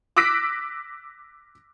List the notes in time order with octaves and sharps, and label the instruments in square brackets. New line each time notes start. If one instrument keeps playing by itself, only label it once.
[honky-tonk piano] D6 E6 F#6 A#6 B6 D7